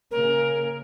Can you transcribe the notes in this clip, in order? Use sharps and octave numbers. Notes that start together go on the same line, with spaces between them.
C#3 A#3 A#4